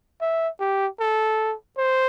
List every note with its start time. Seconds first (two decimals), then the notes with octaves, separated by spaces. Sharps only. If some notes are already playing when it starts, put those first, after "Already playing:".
0.21 E5
0.60 G4
1.00 A4
1.78 C5